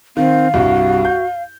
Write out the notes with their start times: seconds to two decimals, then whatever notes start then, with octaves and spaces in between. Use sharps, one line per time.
0.17 D#3 C4 F5
0.54 C2 G2 F#4
1.05 G6